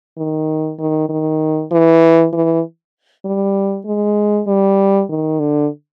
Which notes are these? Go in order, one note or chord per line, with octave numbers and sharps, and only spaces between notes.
D#3
D#3
D#3
E3
E3
G3
G#3
G3
D#3
D3